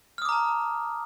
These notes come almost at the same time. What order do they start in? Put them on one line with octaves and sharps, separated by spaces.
F6 D#6 D6 A#5 A5